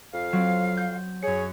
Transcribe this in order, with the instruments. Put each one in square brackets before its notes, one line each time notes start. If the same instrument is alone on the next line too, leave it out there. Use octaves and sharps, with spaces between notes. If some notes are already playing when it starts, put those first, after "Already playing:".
[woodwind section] F2 F5
[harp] F#3 C4
G6
[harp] F#2 C#7 [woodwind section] G#4 C#5